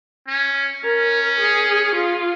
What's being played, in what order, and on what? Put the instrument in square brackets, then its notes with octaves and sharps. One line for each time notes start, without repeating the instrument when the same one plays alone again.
[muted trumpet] C#4
[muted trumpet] C#4 [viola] A#4
[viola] G#4
F4